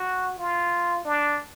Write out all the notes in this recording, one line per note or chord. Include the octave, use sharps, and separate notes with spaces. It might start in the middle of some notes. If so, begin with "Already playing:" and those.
Already playing: F#4
F4
D4